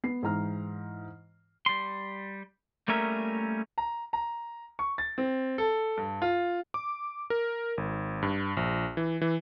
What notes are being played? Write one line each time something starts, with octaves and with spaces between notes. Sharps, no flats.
B3 C7
G#2 E3 A#5 F6
G3 C6
G3 A3 A#3 C#4 A#4 E5
A#5
A#5
C#6
A6
C4
A4
G2
F4
D6
A#4
G#1
G2
A#1
E3
E3